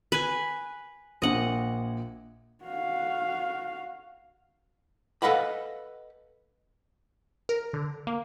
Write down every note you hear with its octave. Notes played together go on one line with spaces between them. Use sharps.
B4 G#5
A#1 A#2 D#5 F#5
F#4 F5
A4 B4 D#5 F5 F#5 B5
A#4
D3
A#3